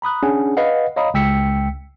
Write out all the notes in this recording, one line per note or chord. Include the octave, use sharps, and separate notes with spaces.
A#5 B5 D#6 F#6
C#4 D4 G#4 F#5
B4 D#5 F5 F#5
C#5 D#5 F5 A#5 B5 D#6
C#2 G5 E6 B6 C#7